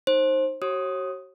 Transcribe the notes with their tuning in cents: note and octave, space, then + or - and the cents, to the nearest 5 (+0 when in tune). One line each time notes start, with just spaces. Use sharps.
D#4 +0 C5 +25
F#4 +40 C#5 -35 D#6 +5